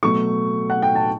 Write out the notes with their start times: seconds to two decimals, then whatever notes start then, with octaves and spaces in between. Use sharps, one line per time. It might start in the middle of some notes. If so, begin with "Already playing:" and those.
0.03 B2 F#3 A3 C#6
0.70 F#5
0.82 G5
0.95 A5